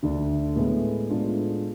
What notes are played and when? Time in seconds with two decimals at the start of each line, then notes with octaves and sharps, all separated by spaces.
0.03 D2 D3 A3 D4
0.56 A2 G#3 B3
1.09 A2 G#3 B3 D4 F4